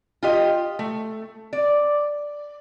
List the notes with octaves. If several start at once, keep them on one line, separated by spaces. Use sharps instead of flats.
F4 G4 D#5
A3
D5